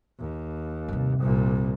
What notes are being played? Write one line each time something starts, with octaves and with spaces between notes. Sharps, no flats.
D#2
G2 C3
C2 A#2